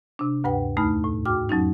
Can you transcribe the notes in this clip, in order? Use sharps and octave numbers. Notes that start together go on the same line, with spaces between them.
C3 D4
D2 G2 B4 F#5 G5
E2 A3 D#4 B5 F6
A2
G#2 F#4 G5 D6 F6
F2 F#3 C#4 D#4